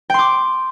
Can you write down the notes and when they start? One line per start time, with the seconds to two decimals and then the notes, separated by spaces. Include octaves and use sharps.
0.10 G5
0.14 C6
0.19 D6